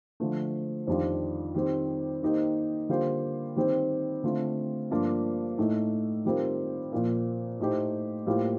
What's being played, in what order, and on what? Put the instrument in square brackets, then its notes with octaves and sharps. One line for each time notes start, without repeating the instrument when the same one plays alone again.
[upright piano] D3 F3 A3
F2 D#3 G3 D4 F4
D#3 G3 C4 G4
D#3 A#3 D#4 G4 C5
D3 G3 A#3 F4 C5
D#3 G3 C4 G4 C5
D3 A3 C4 F4
G2 F3 A#3 D4 F4
A2 A3 D#4 A4
D#3 G3 C4 F4 A#4
A#2 F3 A#3
A2 A3 D#4 G4 C5
A2 G3 A#3 F4 C5